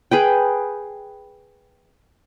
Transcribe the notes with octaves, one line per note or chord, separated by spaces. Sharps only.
G#4 B4 G5